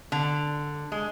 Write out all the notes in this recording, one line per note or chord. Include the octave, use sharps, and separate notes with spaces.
D3
G#3